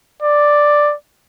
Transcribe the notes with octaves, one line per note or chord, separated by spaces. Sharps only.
D5